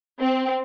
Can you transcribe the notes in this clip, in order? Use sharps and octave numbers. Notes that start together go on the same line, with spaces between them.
C4